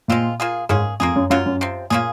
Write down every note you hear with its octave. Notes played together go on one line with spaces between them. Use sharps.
A#2 G#3 C4 F4
A#3 F4 G#4
G#2 A#3 C#4 G#4
F2 A#3 F4 G#4
F#2
F#2 F#3 A#3 F4
F#2
C3 F3 C4
A#2 A#3 C#4 F4 G#4